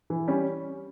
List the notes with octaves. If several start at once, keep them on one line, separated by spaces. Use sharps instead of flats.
E3
G3 C#4